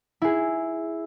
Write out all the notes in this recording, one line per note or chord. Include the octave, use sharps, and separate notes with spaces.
E4 G#4